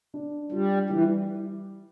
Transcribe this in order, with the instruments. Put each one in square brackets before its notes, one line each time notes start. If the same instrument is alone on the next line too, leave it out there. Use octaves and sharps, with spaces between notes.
[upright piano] D4
[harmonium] G3 [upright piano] F4
[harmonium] E3 [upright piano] G3